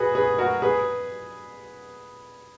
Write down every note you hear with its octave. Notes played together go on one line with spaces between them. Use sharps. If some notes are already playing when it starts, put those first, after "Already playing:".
Already playing: F#4 G#4 B4
G#4 B4
F#4 A#4
G#4 B4